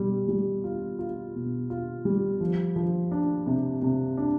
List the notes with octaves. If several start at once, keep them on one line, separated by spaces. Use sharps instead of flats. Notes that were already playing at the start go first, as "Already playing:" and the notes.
Already playing: B2 G3
G3
F4
F4
B2
F4
G3
F3
F3
D4
C3
C3
D4